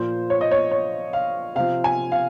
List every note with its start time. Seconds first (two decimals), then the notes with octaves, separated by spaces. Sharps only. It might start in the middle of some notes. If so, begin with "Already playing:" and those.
Already playing: A#2 F3 C5
0.30 C#5
0.41 D#5
0.51 C#5
0.71 C#5
1.13 F5
1.55 C3 F3 F5
1.84 G#5
2.12 F5